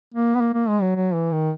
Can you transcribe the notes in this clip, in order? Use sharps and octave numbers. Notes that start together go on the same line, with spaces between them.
A#3
B3
A#3
A#3
G#3
F#3
F#3
E3
D#3